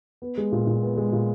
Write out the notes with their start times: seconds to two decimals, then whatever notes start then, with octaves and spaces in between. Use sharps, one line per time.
0.22 B3
0.38 G#3
0.52 A#2
0.67 A#2
0.82 B3
0.97 G#3
1.13 A#2